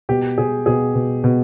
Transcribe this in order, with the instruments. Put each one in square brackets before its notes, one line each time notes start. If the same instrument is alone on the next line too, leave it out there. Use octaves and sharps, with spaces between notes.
[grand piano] B2 G4
B2 G#4
B2 G#4
B2
B2